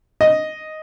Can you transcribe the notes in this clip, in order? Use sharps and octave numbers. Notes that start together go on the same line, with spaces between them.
D#5